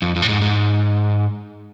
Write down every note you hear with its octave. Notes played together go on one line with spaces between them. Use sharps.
F2
F2
A2
G#2
G#2